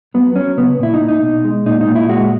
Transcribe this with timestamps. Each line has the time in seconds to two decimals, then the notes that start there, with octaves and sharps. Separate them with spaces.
0.14 F#3 B3
0.36 F#3 C#4
0.58 C#3 B3
0.79 A#2 E4
0.94 D#4
1.01 A#2
1.08 D#4
1.23 B2
1.45 G#3
1.66 A#2 D#4
1.81 D#4
1.88 A#2
1.95 E4
2.09 G#3 F#4